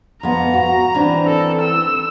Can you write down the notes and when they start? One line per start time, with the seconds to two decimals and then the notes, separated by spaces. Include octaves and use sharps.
0.23 F2 B3 A#5
0.53 F#4
0.94 E3 C4 D4
1.26 A4
1.61 E6